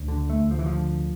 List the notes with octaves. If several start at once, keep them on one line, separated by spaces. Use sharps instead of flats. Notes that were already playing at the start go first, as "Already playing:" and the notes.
Already playing: D2
D3
A3
D2
F3
E3
F3
D3